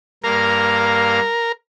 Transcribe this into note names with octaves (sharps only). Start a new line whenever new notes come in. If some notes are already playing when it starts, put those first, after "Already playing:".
G2 A#3 A#4 F5